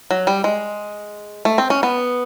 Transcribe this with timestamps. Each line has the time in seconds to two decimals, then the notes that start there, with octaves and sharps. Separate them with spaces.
0.11 F#3
0.27 G3
0.44 G#3
1.45 A3
1.58 C4
1.70 C#4
1.83 B3